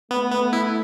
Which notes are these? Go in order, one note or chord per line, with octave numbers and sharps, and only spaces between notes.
A3 B3
B3
E4